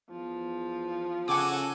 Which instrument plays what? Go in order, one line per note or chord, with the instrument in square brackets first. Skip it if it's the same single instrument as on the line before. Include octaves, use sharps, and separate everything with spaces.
[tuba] E2 [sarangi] F3
[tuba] C#3 [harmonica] F#4 A4 G#5 [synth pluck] F#5 D6